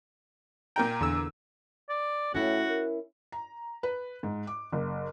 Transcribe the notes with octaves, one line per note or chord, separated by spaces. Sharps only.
A#2 A#4 G5 A#5
E2 D3 E6
D5
A2 C#4 E4 F#4
A#4
A#5
B4
G#2
D6
F#1